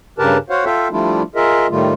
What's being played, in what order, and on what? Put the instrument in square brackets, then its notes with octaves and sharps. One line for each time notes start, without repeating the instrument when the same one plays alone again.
[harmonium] G2 C#3 G4 A#4 B4 A5
F#4 C5 C#5 F5 F#5
F4 A4 E5 F5 G5
F3 G3 A3 D4 E4 F4
F4 G#4 A#4 D#5 E5
A2 D#3 G3 A3 F4